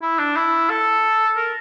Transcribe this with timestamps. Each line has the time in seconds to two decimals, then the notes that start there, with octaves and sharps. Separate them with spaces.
0.02 E4
0.19 D4
0.36 E4
0.70 A4
1.37 A#4